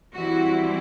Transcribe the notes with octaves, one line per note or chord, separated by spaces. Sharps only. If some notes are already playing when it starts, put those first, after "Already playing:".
E3 G3 C4 E4 F#4